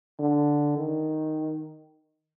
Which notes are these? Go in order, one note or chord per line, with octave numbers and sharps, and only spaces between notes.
D3
D#3